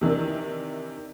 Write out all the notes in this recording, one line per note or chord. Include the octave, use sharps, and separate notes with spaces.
C3 D#3 E3 D4